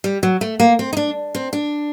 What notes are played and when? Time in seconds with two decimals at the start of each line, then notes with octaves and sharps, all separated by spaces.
0.04 G3
0.23 F#3
0.41 A3
0.60 A#3
0.79 C4
0.93 D#4
0.97 D4
1.35 C4
1.53 D4